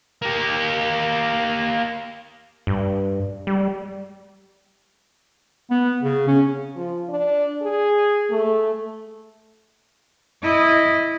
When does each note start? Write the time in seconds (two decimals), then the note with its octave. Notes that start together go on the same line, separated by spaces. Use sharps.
0.22 A#3 G4
2.67 G2
3.47 G3
5.71 B3
6.02 C#3
6.28 C#4
6.76 F3
7.09 D4
7.62 G#4
8.31 A3
10.43 E4 D#5